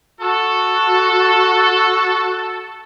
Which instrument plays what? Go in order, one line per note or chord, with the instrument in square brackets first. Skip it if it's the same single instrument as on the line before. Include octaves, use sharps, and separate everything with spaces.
[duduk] F#4 [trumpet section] A4